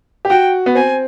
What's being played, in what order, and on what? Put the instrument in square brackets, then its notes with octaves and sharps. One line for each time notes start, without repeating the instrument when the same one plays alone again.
[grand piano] G4
[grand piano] F#4 [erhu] G5
[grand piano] B3
[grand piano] C4 [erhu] G#5